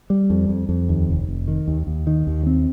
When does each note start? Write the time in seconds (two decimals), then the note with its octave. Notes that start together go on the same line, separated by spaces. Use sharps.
0.10 G3
0.30 F2
0.49 F2
0.69 F2
0.89 D#2
1.08 F1
1.28 F1
1.48 D#3
1.68 D#2
1.87 D#2
2.07 D#3
2.27 D#2
2.47 C4